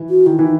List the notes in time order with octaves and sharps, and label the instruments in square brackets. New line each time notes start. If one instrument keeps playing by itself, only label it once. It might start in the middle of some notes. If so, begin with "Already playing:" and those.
Already playing: [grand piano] E3
[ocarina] F#4
[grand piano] D#3 [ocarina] E4
[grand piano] E3 [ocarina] D#4